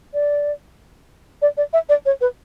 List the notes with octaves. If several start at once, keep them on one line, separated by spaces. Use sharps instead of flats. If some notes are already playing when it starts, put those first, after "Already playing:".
D5
D5
D5
E5
D5
C#5
B4